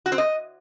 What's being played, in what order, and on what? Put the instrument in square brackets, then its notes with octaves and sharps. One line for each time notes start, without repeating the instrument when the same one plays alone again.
[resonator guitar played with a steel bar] F#4
C4
D#5